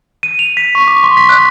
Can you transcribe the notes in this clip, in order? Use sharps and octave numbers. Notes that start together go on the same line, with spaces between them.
D#7
F7
B6
C#6
D6
C6
B6
F#6